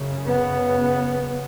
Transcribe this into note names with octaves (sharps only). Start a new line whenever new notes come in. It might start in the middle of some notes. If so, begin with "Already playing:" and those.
Already playing: F#2 C#3
B3